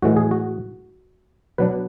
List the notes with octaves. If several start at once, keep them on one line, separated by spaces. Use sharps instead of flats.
A2 E3 G#3 F#4
G#4
F#4
B2 F#3 B3 D4 B4